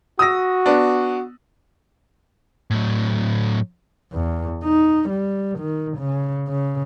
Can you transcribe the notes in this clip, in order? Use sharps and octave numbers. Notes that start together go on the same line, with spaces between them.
F#4 D#6 E6 A#6
B3 D4
A2 F#3
E2
D#4
G3
D#3
C#3
C#3